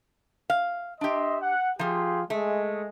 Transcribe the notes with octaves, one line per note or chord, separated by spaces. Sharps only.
F5
D4 G4 D#5 E5 C6
F#5
F3 F4 G4 G#4 C6
G#3 A3